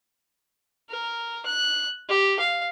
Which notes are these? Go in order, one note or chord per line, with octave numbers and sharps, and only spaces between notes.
A#4
F#6
G4
F5